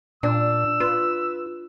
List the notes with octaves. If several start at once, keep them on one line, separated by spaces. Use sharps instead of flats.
A#2 D4 E6
F4 B4